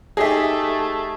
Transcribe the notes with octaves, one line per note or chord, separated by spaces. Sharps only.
A3 D#4 G4 G#4 D#5 E5